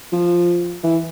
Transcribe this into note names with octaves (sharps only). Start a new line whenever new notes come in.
F3
E3